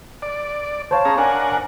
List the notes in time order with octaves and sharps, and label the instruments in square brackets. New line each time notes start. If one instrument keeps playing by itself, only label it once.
[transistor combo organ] D5
[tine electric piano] C5 C#5 F5 [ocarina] A5
[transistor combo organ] C#4 G#4 A#5
[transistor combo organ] D4 A#4 F#5 [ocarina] G#5